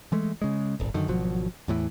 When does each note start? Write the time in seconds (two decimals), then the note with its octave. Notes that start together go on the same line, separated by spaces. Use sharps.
0.12 E3 G#3 A3
0.42 C#3 G#3
0.80 D#1 G#1
0.94 F#2 D3 D#3
1.08 G#1 B2 F3 F#3
1.68 E2 A2 E3